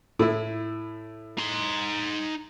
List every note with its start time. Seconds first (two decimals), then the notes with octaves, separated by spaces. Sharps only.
0.19 A2 E4
1.39 D#4 C6